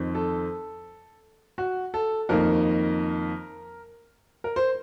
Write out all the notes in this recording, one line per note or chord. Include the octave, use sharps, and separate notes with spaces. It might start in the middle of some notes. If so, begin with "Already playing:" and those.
Already playing: F2 D#3 C4
A4
F#4
A4
F2 D#3 A#3 A#4
A#4
C5